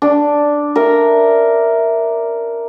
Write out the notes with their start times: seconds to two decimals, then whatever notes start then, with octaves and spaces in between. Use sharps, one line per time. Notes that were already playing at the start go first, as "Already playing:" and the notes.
0.02 D4
0.76 A#4 E5